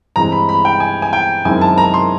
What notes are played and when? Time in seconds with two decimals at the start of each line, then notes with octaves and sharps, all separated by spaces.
0.16 G2 E3 G#3 C4 A#5
0.32 B5
0.49 B5
0.65 G5
0.80 G#5
1.02 G#5
1.13 G5
1.45 F#2 D#3 G#3 C4 E4 G#5
1.61 A5
1.78 A#5
1.94 C6